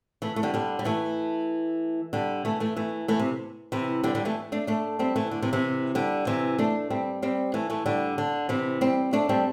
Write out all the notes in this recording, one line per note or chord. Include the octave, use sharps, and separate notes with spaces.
E3 A3
A3
D3 G3
D3 G3
G3
E3 A3
D3 G3
E3 A3
E3 A3
E3 A3
E3 A3
C3
C3 E3
D3 G3
D3 G3
E3 A3
A3 D4
A3 D4
G3 C4
E3 A3
D3
C3 E3
C3 E3
D3 G3
C3 E3
A3 D4
G3 C4
G3 C4
E3 A3
E3 A3
D3 G3
D3
C3 E3
G3 C4
A3 D4
G3 C4